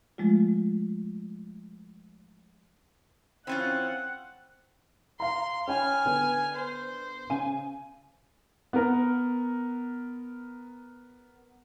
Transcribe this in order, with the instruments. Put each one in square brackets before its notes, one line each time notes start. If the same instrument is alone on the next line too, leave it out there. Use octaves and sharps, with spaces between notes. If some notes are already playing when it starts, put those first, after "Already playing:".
[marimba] F3 G#3 A3 F4
[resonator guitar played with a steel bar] E3 C#4 F4 [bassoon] C4 [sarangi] F#5
[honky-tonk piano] F5 A#5 [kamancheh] C6
[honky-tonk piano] C#4 G5 B5 [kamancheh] G#5 F6
[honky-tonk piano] D3 B3
[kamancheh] C5
[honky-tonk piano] C#3 G#5 D#7
[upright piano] B3 A#4